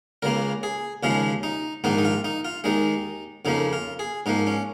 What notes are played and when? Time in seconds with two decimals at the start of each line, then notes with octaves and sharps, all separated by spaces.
0.22 C#2 C#3 A#3 A#4
0.63 G#4
1.03 D#2 C#3 F3 G#3 F4
1.43 D#4
1.84 A#1 G#2 D#3 A#3 D#4
1.98 D#4
2.05 F4
2.24 D#4
2.45 F4
2.64 D#2 D#3 G#3 D#4
3.45 F2 C#3 F3 A#3 D#4
3.73 F4
3.99 G#4
4.26 G#2 F3 A#3 D#4
4.47 C#4